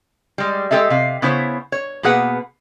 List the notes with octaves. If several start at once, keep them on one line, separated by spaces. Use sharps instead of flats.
G3 G#3
G#3 G4 A4 D#5 E5
C3 F5
C#3 B3 E4 C5 C#5
C#5
B2 A#3 G#4 B4 F#5